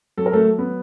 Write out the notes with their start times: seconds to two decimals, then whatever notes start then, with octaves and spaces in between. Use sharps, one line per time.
0.17 F#3 A4
0.26 A#4
0.33 A3 A4
0.59 B3